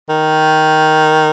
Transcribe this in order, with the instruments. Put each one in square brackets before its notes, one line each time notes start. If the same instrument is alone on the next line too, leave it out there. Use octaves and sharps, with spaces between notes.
[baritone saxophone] D#3